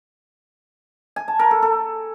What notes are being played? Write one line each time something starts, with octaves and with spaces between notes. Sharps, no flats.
G#5
A5
A#4
A4
A4